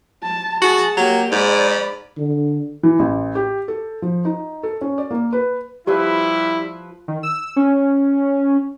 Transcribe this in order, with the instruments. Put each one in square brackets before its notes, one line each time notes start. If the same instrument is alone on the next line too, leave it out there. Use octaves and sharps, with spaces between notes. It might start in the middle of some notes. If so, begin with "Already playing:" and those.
[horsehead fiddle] A5
[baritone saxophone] F#4 [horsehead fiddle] G#4 A5
[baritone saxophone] F#3 [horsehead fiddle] A#3 G4
[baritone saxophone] G#2 [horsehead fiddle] D5 B5
[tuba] D3
[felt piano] E3
A1
G4
A4
F3
D#4
A4
C#4
D5
A#3
B4
[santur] F3 B4 E6 [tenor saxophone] G3 [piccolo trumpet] E4 [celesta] G4
[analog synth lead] D#3
E6
C#4